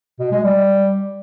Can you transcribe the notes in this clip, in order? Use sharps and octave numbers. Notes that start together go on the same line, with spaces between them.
B2
G#3
G3